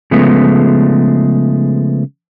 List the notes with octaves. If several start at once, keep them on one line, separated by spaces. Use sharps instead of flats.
C#3 F3 G#3 A3 B3